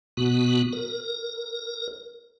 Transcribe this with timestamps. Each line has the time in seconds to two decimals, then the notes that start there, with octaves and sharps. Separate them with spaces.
0.17 B2 B3 F#4
0.73 A#4